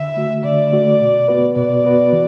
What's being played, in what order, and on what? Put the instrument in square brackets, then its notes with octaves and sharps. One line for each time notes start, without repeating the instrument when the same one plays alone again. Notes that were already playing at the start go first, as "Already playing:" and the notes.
Already playing: [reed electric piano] D3 [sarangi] E5
[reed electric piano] A3 F#4
[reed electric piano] D3 [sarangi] D5
[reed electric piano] A3 F#4
B2
B3 F#4 B4
[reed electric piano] B2 [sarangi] D5
[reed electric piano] B3 F#4 B4
E3